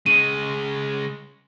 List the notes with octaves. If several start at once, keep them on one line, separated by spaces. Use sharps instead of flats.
C#3 G#3 D#7